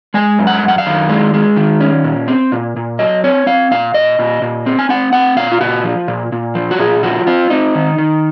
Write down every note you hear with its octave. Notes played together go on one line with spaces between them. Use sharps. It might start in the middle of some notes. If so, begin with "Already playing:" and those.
G#3 G#5
F#2
F#5
F#2
F#5
F5
D#3
G#3
G#3
D#3
C#4
A#2
C4
A#2
A#2
F#3 D#5
C4 C#5
C4 F5
A#2 F5
A#2 D#5
A#2
A#2
C4
G#5
C4 F#5
C4 F#5
A#2 F5
F4
A#2 F#4
F3
A#2
A#2
F3
F#4
A#2 G#4
F3 F#4
C4 F4
C4 D#4
D#3
D#3